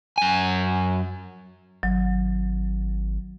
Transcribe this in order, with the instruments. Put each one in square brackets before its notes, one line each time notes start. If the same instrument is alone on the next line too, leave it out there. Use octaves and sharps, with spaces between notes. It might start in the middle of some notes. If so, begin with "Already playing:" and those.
[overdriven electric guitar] F#2 G#5
[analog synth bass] G#1 [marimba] F#3